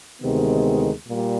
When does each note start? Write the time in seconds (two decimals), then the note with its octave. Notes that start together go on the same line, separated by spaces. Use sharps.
0.22 D2 C3 D#3 G#3 B3
1.08 A#2 G3